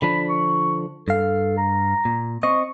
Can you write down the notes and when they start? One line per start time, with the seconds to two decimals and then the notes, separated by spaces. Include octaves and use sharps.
0.02 D3 F3 D4 B5
0.29 C#6
1.08 G2 A4 F5
1.57 A#5
2.05 A#2
2.43 C4 D#5 C#6